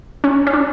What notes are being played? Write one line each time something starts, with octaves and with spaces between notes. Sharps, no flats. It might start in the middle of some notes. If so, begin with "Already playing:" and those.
C#4
C#4
D4